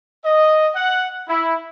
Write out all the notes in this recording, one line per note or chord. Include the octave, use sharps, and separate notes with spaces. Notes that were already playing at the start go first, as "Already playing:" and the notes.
D#5
F#5
E4